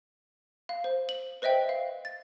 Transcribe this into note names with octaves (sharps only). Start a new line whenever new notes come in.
F5
C5
F#7
B4 C5 D#5 E5 G5
F5
A6